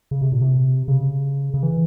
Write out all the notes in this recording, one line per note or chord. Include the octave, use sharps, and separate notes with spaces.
C#3
C3
A#2
C3
C#3
C#3
E3